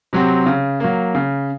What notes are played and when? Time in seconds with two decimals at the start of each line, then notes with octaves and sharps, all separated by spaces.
0.13 C3 F#3 C4
0.46 C#3
0.80 F#3 A#3
1.15 C#3